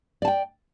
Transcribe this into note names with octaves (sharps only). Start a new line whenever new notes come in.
D5 G5 A5